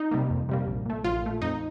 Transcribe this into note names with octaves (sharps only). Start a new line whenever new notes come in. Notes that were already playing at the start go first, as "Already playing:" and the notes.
Already playing: D#4
C3 G3 A#3
F2
C3 G3 A#3
A#1
A#2 A3
A#1 F4
A#2 A3
F2 D#4